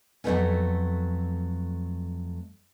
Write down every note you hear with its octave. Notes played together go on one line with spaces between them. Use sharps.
F2 F#3 G#3 A3 B3 C#4